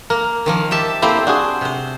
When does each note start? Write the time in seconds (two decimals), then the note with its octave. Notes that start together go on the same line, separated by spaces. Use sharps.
0.10 A#3 A#4
0.46 D#3 F3 A#3
0.71 G4 E5 A5
1.02 A#3 C4 E4 G4 A4 C5
1.27 D4 F#4 G#4 C5
1.61 C3 C5